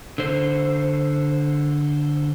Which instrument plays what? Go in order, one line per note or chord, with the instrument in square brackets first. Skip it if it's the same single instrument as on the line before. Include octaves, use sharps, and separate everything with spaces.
[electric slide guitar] D3 C5